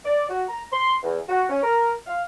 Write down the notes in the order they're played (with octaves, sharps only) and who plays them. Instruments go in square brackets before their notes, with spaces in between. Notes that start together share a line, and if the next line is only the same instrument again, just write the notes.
[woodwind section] D5
F#4
A#5
C6
E2
F#4
C#4
A#4
F5